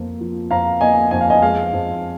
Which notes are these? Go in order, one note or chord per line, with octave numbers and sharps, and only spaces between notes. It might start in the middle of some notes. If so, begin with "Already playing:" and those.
Already playing: F2 A#3
F3
F2 F5 A#5
A#3 D#5 G#5
F2 G#5
F5
D#5 G#5
G#3 F5
F2